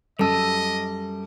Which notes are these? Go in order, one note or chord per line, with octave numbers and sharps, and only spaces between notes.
F#2 G3 A4 D#5 A5 E6